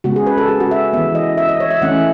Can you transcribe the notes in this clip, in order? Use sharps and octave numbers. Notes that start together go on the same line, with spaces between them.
C#3 G#3 B3 F#4
G#4
B4
A4
G#4
F#4
E5
E3 B3 E5
D#5
E5
D#5
C#5
E5
E3 A3 C#4 F#5